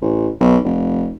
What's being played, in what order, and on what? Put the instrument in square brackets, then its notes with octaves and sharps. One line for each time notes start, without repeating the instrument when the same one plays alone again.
[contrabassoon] A1
B1
F1